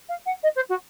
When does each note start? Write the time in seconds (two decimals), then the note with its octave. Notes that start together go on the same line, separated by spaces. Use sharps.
0.09 F5
0.26 F#5
0.43 D#5
0.55 C5
0.69 F#4